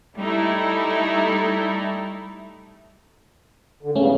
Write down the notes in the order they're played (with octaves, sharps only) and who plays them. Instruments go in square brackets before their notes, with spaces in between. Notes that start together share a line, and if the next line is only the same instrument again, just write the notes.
[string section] G3 A3 D#4 E4
[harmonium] D3
[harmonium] E2 G2 C#3 [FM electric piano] A3 C#4